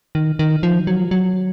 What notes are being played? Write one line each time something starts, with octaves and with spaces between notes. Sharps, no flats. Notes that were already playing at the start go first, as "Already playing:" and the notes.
D#3
D#3
F3
F#3
F#3